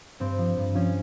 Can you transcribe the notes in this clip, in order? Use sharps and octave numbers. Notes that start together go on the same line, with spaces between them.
G2 C4
F3
G2
F3 C#4